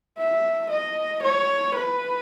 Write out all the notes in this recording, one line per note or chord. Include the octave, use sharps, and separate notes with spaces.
E5
D#5
C#5
B4